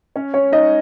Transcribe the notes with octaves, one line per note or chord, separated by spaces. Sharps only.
C#4 C#5
C#4 C#5
D#4 D#5